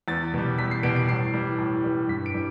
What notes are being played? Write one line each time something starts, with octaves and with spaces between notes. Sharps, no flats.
E2 A6
B2 G3
E2 B6
C7
B2 G3 D7
D7
A2 C7
E3 G3
A2
E3 G3
G2 B6
D7
E3 G3